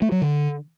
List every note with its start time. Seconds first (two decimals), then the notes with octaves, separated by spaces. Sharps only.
0.02 A3
0.12 F#3
0.22 D3